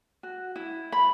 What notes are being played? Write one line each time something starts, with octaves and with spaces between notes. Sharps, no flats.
F#4
E4
B5